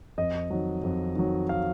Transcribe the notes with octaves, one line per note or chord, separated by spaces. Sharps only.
F2 D#5
D#3 F#3
F2
D#3 F#3
F5